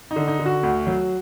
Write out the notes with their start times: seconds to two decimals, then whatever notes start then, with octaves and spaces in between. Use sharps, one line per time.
0.11 D#4
0.16 D3
0.28 D#4
0.39 D3
0.46 F#4
0.63 D2
0.87 F#3